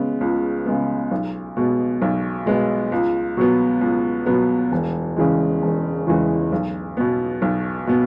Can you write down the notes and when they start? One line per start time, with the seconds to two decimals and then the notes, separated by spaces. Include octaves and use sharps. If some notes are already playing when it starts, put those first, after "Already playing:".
Already playing: C#3 G#3 B3
0.21 C#2
0.66 C#3 G#3 B3
1.11 B1
1.57 B2 G#3 B3
2.02 B1
2.46 B2 G#3 B3
2.92 C#2
3.37 B2 F#3 B3
3.81 C#2
4.26 B2 F#3 B3
4.72 E1
5.16 E2 C#3 E3 G#3
5.62 E1
6.07 E2 C#3 E3 G#3
6.52 B1
6.97 B2 B3
7.42 B1
7.87 B2 B3